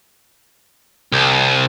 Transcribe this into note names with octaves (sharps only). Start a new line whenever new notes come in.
C2